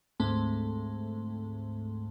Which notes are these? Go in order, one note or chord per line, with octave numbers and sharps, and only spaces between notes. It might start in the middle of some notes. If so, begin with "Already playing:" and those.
D2 G#2 A3 C4